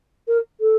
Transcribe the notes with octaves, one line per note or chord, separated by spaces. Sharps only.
A#4
A4